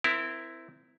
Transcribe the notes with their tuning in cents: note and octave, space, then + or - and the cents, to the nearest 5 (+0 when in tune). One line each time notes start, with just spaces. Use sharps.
C4 -25 E4 +0 A#4 +0